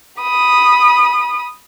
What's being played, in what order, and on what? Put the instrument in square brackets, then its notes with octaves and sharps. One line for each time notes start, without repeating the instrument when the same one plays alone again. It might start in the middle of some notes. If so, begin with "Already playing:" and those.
[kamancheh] B5 D#6